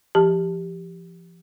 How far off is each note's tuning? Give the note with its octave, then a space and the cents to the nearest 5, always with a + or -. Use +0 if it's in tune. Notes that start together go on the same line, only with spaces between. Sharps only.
F3 -30 G4 +0 A5 +5